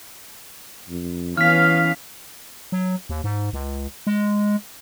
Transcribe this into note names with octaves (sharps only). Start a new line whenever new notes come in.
F2
E3 B3 C#4 F5 F6 B6
F#3
D#2
G#2
C#2
G#3